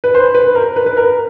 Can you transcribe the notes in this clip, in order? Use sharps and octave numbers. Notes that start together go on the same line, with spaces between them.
B4
C5
B4
A#4
B4
B4
A#4